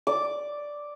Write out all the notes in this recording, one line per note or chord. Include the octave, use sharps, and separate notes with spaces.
D5 D6